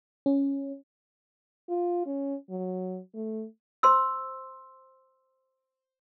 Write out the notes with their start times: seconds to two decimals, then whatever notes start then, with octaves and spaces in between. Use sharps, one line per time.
0.26 C#4
1.69 F4
2.06 C#4
2.50 F#3
3.14 A3
3.83 C5 C6 E6